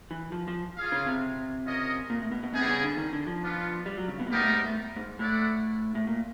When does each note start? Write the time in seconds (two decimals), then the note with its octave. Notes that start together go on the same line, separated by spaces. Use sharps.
0.11 E3
0.32 F3
0.48 F3
0.77 F4 G#4 C#5 F5
0.92 C#3
1.07 C3
1.65 C#4 F4 A#4 D#5
2.10 A#2
2.21 A2
2.32 B2
2.43 B2
2.54 C3 G3 B3 D#4 G#4
2.68 C#3
2.83 D3
2.97 D#3
3.13 D3
3.27 F3
3.42 B3 D4 F4
3.86 G3
3.97 F#3
4.08 C#3
4.20 B2
4.27 A2
4.30 A#2 G3 B3 D#4 G4 A#4
4.42 A2
4.52 G#2
4.64 A2
4.96 G#2
5.19 A2 E4 A4 D5 F#5
5.95 A2
6.07 A#2